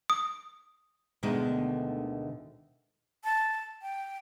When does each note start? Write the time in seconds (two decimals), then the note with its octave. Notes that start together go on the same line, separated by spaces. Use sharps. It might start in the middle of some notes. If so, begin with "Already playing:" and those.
0.10 D#6
1.23 D2 B2 D3 D#3 G#3 A3
3.24 A5
3.82 G5